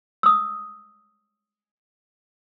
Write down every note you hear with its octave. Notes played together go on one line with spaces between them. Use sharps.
D#6 E6